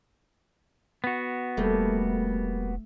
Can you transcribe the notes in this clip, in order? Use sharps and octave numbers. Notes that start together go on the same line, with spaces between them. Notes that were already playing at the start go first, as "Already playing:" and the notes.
B3 F#4
E1 G3 A3 A#3